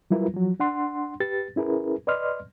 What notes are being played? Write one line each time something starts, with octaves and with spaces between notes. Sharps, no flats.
F#3 G3 E4 F4 A#4 B4
F3 F#3
D4 F#5 C6
G4 B4 A6
C#4 E4 G#4 A#4 B4
B4 D5 D#5 C6 F6